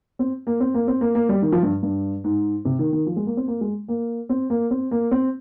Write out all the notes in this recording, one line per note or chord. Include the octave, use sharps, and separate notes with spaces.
C4
A#3
C4
A#3
C4
A#3
A#3
G3
D#3
F3
G2
G2
G#2
C3
D#3
D#3
F3
G#3
A#3
C4
A#3
G#3
A#3
C4
A#3
C4
A#3
C4